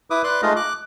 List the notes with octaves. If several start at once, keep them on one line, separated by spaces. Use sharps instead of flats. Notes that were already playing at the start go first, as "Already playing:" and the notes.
E4 B4 D6 D#6
B4 D5 C6 D6 F#6
G#3 A3 D#4 F4 D#5 F5
D6 F#6